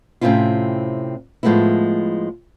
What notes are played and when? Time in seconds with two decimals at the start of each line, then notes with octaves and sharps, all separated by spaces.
0.21 A2 C3 C4 C#4 E4 F4
1.43 A2 F3 G#3 A3 B3 E4